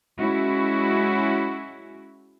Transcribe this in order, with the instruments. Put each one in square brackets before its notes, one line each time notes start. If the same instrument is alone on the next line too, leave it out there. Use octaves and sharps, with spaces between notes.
[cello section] G#3 C#4 E4 F#4